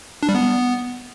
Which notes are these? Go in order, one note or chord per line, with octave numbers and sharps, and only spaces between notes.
D4
G3
B3